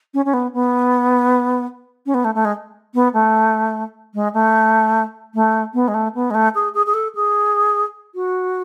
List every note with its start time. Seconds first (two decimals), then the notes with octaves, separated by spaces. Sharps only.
0.14 C#4
0.25 C#4
0.33 B3
0.53 B3
2.06 C#4
2.14 B3
2.24 A3
2.35 A3
2.45 G#3
2.94 B3
3.13 A3
4.14 G#3
4.33 A3
5.34 A3
5.74 B3
5.88 G#3
5.94 A3
6.15 B3
6.30 G#3
6.34 A3
6.54 G#4
6.74 G#4
6.86 G#4
6.94 A4
7.15 G#4
8.15 F#4